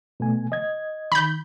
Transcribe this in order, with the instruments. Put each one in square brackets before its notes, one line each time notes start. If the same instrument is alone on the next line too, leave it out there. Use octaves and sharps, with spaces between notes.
[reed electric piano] B2 A3 G#5
D#5 G#6
[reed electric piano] D#3 [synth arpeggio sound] B5 G6